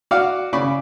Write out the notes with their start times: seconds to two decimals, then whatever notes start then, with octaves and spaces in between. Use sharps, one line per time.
0.11 F#4 D5 F5
0.53 C#3 D5 B5 C#6